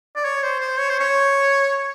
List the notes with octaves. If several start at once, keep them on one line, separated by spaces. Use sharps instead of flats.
D5
C#5
C5
C5
C#5
C5
C#5